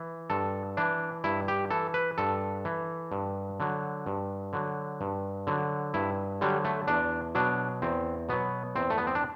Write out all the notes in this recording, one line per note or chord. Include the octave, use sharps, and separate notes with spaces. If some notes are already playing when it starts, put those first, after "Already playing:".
Already playing: E3
G2 A4
E3 D4
G2 E4
G4
E3 A4
B4
G2 A4
E3
G2
D3 F#3
G2
D3 F#3
G2
D3 F#3
G2 E4
D3 F#3 G3
A3
E2 D4
B2 F#3 D4
E2 C4
B2 F#3 B3
E2 C4
A3
B3
C4
D4